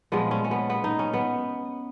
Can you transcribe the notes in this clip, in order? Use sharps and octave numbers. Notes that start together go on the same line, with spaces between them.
A#2 F3 G#3 B3
C#4
C#4
B3
B3
D#4
C#4
B3